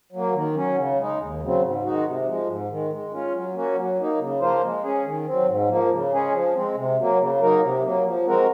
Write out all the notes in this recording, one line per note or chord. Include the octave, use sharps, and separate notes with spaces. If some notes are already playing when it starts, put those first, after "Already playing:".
F#3 A#3
D#3
F#3 C#4
C#3
G#3 D#4
D#2
C#3 F#3 C4
G#2
D#3 G#3 D#4 F#4
C3
F3 G#3
G#2
D#3 G#3
G#3
C#4 F4
F#3
A#3 C#4 F#4
F#3
A#3 D#4
C#3
F3 A#3 F4 C5
G#3
C#4 G#4
D#3
F#3 C4
G#2
F3 A#3
C#3
G#3 C#4 G#4
F3
G#3 C4
C3
F#3 A#3
C#3
F#3 A#3 D#4 A#4
C3
F#3 A#3
F3
G#3 C4 F#4 A#4